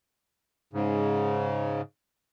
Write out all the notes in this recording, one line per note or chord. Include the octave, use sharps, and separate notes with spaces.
G#2 C#3